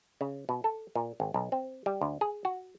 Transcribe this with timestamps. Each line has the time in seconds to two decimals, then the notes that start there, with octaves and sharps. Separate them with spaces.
0.21 C#3
0.49 B2
0.64 A4
0.95 A#2
1.20 G#1
1.34 B1
1.52 C4
1.86 G3
2.01 D2
2.21 G#4
2.45 F#4